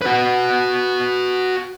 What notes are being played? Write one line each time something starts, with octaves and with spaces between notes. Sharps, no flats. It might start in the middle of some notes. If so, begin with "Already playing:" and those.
F#4 B4